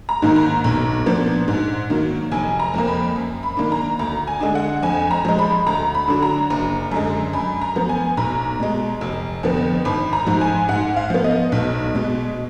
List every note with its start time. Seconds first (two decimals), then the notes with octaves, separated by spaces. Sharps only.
0.09 A#5
0.22 G#2 D#3 A#3
0.36 A#5
0.64 B1
1.06 A#2 F3 B3 D4
1.48 G#2
1.90 D#3 F#3 A#3
2.32 F1 G#5
2.60 A#5
2.74 F2 F3 A#3
2.88 B5
3.16 F#2
3.43 B5
3.57 D#3 A#3 D4
3.72 A#5
3.99 D2 A#5
4.27 G#5
4.40 D3 G#3 D4
4.55 F#5
4.83 F2 G#5
5.11 A#5
5.25 F3 G#3
5.39 B5
5.67 D2 A#5
5.95 B5
6.08 D3 F#3 D4
6.22 A#5
6.50 F#1
6.91 F#2 D3 G#3
7.33 F#2 B5
7.61 A#5
7.76 F3 B3
7.89 G#5
8.17 B1 A#5
8.60 B2 G#3
9.01 F1
9.43 F2 D3 F3 B3
9.85 G#1 B5
10.13 A#5
10.26 G#2 F3
10.41 G#5
10.69 G#2 F#5
10.97 F5
11.10 F3 B3
11.24 D#5
11.52 B1
11.95 B2 G#3